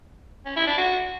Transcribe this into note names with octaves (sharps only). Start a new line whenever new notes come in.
C#4
E4
D4
F#4